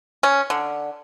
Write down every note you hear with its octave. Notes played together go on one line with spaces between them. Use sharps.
C#4
D3